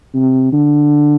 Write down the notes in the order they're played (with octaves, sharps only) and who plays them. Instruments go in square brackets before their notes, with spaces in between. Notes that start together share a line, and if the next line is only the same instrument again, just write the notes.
[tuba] C3
D3